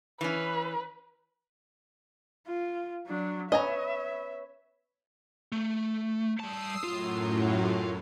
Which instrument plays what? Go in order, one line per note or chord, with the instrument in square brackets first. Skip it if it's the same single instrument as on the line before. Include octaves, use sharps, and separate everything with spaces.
[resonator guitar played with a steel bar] E3 C#4 [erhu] B4
[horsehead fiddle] F4
F#3 D4
[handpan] B4 C#5 [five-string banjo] D#5 G#5 A#5 [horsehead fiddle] E5
[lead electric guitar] A3
[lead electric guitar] G3 A5 [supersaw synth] D#6 E6 C7
[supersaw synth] F#2 A2 F#3 [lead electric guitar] F4